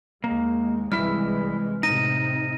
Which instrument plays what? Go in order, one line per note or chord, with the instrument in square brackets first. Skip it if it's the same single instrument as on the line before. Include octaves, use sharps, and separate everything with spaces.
[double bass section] D#2 G#3 [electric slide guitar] A#3
[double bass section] C2 E3 G#3 [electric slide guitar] G3 E4 E5 [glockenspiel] F6
[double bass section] A2 C3 [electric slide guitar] D#4 [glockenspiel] A#6 D#7